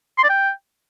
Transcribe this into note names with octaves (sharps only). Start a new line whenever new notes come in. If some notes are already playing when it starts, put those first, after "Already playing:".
C6
D5
G5